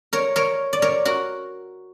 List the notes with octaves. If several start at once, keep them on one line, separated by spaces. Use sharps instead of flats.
A#4 C#5
A#4 C#5
D5
A#4 C#5
F#4 A#4